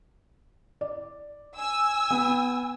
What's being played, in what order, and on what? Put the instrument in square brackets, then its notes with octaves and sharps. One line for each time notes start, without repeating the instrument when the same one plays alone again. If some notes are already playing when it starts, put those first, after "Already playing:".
[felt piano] D5
[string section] G#5 E6
[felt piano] B3